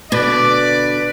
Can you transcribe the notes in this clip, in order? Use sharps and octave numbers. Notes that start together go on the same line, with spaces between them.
B2 D3 B4 D5